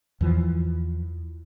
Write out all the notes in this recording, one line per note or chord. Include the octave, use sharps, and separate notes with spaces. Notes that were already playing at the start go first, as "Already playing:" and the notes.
E2 E3 F3